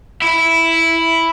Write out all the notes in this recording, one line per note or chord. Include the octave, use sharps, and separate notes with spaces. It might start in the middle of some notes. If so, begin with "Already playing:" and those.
E4